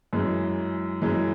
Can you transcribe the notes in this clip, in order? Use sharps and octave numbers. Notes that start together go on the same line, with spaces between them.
F#2 E3 G#3
F#2 E3 G#3